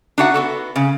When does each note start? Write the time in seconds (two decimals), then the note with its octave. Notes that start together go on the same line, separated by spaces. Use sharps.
0.18 D4 D#4 F#4 E5 F#5
0.34 B3 F#4 A4
0.76 C#3